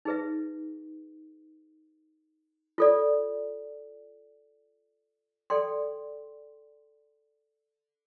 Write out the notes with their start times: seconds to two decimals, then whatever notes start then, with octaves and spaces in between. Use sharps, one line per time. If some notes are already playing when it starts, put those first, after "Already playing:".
0.05 D#4 G#4 B4 E5
2.78 F4 A4 D5
5.50 A4 D5 G5 C6